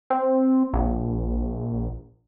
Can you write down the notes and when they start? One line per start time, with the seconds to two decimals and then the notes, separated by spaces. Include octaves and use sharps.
0.10 C4
0.73 A#1